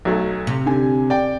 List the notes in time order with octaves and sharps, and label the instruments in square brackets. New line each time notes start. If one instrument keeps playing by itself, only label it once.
[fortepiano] B1 F#3 A3
[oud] C3
[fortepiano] D3 G#5
D5 G5